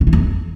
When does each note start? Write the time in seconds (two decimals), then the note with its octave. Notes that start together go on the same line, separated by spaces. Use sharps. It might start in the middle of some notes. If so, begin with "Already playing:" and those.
0.01 C#3
0.07 E3
0.13 F2